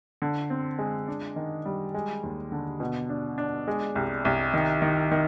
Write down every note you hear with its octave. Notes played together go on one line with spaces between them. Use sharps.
D3
C4
G#3
D4
D#3
G3
G#3
D#2
D3
B2
D4
D4
G#3
C2
C2
D#3
D#3
D#3